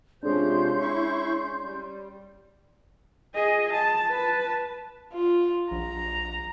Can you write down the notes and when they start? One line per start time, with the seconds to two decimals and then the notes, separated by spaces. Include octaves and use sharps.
0.23 C3 F3 G#3 C#4 D4 C6 G6
0.80 E4 C#6
1.63 G3
3.35 G#4 D#5
3.73 A5
4.09 B4 A5
5.14 F4
5.72 A#1 A#5